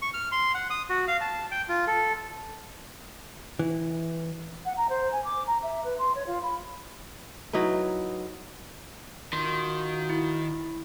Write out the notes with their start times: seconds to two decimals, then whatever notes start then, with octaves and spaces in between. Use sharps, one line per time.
0.02 C#6
0.14 F6
0.32 C6
0.54 F#5
0.70 D#6
0.90 F#4
1.08 F5
1.21 A5
1.51 G5
1.69 F4
1.87 A4
3.59 E3
4.65 F#5
4.77 A#5
4.89 C5
5.12 G#5
5.24 D6
5.47 A#5
5.63 E5
5.84 B4
5.98 C6
6.15 C#5
6.26 F4
6.43 B5
7.53 F#3 D#4 E4 B4
9.33 D#3 F4 F#4 C6
10.10 E4